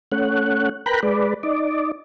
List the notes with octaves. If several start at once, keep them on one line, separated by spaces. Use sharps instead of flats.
A3 C#4 F#5
A#4 B4 G5 A#5 B5 F#6
G#3 B4 D5
D#4 D5